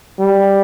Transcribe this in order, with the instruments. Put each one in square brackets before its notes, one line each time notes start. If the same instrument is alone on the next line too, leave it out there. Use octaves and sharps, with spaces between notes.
[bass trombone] G3